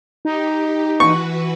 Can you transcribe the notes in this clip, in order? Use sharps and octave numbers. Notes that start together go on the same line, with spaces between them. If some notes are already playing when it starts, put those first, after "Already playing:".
D#4 G4
E3 F#4 B4 C#6